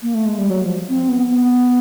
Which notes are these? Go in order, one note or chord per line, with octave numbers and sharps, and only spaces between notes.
A#3
A3
G#3
G3
F#3
F3
C4
B3
B3